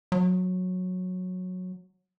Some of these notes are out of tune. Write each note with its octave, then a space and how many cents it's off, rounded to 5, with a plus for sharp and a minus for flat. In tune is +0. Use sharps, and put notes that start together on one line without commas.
F#3 -15